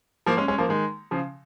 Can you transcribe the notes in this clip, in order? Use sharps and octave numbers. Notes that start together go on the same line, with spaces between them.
F3 A#3
G#3 C#4
G#3 C#4
F3 A#3
D#3 G#3
C#3 F3